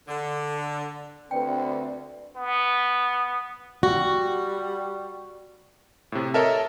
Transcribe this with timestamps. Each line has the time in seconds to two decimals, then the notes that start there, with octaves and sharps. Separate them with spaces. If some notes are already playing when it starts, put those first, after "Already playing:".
0.07 D3
1.31 D2 C4 B4 D5 G5
2.36 B3
3.83 G3 F#4
6.12 A2 C3
6.34 A4 A#4 C#5 D#5 E5 A5